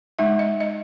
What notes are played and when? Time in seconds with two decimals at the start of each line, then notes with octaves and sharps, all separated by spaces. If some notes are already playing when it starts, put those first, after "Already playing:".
0.19 G#3 D#4 E5
0.39 D#5
0.61 D#5